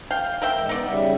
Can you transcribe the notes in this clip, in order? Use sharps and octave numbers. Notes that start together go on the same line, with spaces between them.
F5 G5
A#4 E5 G5
A2 E3 G#3
B3 D#4 D5
C#3 G3 E5